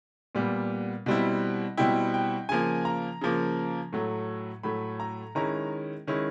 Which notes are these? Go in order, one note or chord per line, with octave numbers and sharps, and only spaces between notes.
A#2 G3 B3
B2 G3 C4 E4
B2 G3 C4 E4 G5
G5
C#3 F3 A#3 G#5
A#5
C#3 F3 A#3
A2 F#3 A3
A2 F#3 A3 B5
A#5
D#3 G#3 C#4 E4 A#5
D#3 G#3 C#4 E4